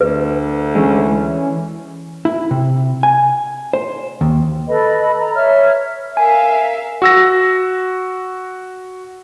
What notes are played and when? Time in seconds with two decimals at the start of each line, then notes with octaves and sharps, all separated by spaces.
0.01 D2 B4
0.75 E3 G#3 C#4
2.25 E4
2.51 C3
3.03 G#5
3.73 C5
4.21 D#2
4.67 A4 B4 D#5 B5
5.19 A#5
5.34 C#5 E5 F6
6.17 A#4 E5 F5 G#5
7.02 F#4 E6 A#6